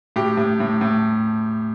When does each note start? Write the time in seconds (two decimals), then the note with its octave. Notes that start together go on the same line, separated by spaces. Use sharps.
0.16 A2 G4
0.37 A2
0.60 A2
0.81 A2